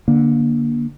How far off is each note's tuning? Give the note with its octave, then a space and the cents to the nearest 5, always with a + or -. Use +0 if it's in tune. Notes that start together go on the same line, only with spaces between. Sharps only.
D3 +0 A#3 +25